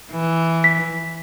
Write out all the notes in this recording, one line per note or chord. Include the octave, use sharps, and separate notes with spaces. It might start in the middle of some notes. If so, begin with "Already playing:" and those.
E3
B6